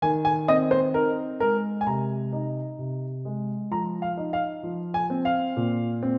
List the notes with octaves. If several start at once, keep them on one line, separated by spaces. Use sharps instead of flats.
D#3 G#5
G#5
C4 D#5
C5
D#4 A#4
G#3 A#4
G#5
C3 A#5
D#4
C3
G#3
F3 A#5
F5
D#4
F5
F3
G#5
C4
F5
A#2
C4